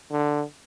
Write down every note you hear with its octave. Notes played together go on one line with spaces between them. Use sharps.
D3